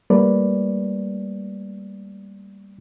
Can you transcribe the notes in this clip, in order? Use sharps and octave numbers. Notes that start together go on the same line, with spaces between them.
G3 A3 A#3 B4 D5